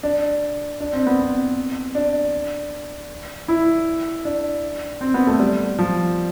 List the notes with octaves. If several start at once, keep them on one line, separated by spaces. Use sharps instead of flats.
D4
D4
C4
B3
C4
D4
E4
D4
C4
B3
A3
G3
F3